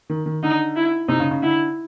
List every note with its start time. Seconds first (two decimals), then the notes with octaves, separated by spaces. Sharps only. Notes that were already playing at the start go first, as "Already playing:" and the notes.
0.10 D#3
0.26 D#3
0.43 D3 D#4
0.76 E4
1.09 C3 D#4
1.20 C#3
1.31 C#3
1.42 D3 E4